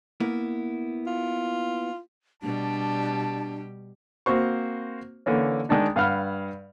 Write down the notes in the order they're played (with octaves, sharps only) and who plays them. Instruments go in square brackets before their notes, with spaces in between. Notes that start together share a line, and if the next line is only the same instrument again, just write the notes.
[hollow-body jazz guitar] A#3 B3 E4
[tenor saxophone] F4
[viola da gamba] B2 G3 G4 [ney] D4 [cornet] A5
[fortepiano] A#3 C4 F#4 C5 C#6
D3 E3 A#3 C#4
D#3 G#3 D4 D#4
G2 F5 F#5 B5 F6